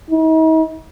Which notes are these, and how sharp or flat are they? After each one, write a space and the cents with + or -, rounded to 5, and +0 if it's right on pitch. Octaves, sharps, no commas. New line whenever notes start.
D#4 +45